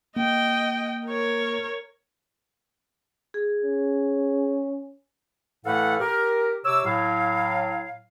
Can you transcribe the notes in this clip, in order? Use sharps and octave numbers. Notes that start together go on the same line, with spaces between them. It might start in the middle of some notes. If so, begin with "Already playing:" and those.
A#3 D#5 G5
A#4 C#5
G#4
C#4
A2 E3 A3 A4 F5 F#5
G4 A#4
C3 C#5 D6 E6
A2 F#3 F5